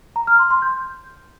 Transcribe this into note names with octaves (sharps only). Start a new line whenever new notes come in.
A#5
F6
C6
C6
G6